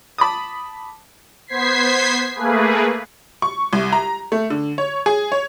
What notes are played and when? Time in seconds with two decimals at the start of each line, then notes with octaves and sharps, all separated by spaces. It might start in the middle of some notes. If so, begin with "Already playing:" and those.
0.18 A5 B5 D6 D#6
1.47 B3 C5 G#6 B6 C7
2.35 A3 A#3 G#4 B4
3.42 C#6
3.73 C2
3.92 A#5
4.32 A3
4.50 D3
4.78 C#5
5.06 G#4
5.32 C#5